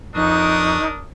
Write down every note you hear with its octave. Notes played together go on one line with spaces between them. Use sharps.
F2 D4 D#4 A#4 C#6 D#6 F#6